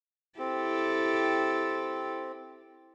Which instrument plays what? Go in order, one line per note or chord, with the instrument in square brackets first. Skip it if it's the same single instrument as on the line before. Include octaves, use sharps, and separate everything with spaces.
[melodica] C4 [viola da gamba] E4 G4 A4